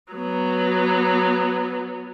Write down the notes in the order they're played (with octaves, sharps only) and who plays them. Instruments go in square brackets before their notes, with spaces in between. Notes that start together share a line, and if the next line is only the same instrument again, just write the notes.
[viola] F#3 B3